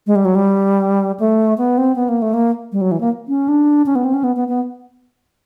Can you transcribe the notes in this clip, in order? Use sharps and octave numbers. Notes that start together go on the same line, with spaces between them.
G#3
G3
F#3
G3
A3
B3
C4
B3
A#3
A3
A#3
G3
F#3
E3
A#3
C#4
D4
C#4
B3
C4
C#4
B3
B3
B3